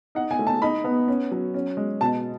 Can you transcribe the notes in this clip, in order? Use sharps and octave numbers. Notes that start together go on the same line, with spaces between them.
D#4 F#5
G#5
A3
A5
D#4 B5
B3
C#4
F#3
C#4
G#3
B2 A5